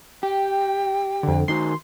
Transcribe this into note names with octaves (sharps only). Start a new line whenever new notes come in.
G4 G5
F2 D3
D#3 D#4 F#4 C6